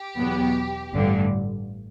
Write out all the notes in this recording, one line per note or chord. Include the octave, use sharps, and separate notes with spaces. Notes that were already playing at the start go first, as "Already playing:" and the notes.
Already playing: G4
E2 B2 F#3 B3
A1 G2 D3